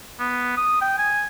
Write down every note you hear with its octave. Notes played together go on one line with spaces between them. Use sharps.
B3
D#6
G5
G#5